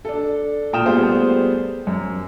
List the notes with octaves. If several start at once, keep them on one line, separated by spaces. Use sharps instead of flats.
D4 A4
A#2 G5 D#6 F6 E7
G3 A3 B3 F4 G#4 C5
F#2